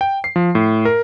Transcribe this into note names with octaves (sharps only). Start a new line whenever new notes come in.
G5
C7
F3
A2
A#4